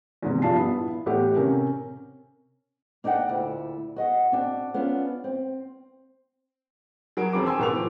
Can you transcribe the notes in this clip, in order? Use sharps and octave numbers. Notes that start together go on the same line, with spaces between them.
E2 G#2 C3
G2 A#2 F3 A5 C7
B3 E4
E2 A2 G4 F#5
C3 C#4 A#4
A#3 D4 D#4 B4 F#5 G5
D2 A#2 E4
F#4 D#5 F#5
C4 D4 F#4
B3 C#4 D4 F4
C4
F#3 G#4 A#4 D7
E1 F2 C4 D6 D7
G5 G#5 C6 E6
G#1 B2 A#4 D6 F7
E3 F3